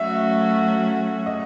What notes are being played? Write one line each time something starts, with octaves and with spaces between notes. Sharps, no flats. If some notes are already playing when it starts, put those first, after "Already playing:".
Already playing: F#3 A3 C#4 F#4 E5
D#5